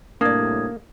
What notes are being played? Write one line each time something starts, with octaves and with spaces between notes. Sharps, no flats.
A2 C3 G3 A#3 D4 D5 D#6 G#6